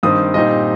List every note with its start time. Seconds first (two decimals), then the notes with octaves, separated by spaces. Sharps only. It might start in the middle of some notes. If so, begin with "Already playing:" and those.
0.03 G2 D#3 C4 D#6
0.34 A#2 G3 C4 D#4 D#5